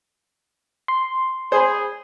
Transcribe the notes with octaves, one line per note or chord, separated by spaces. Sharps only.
C6
G#4 C5 B5